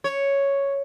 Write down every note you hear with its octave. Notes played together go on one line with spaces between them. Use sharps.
C#5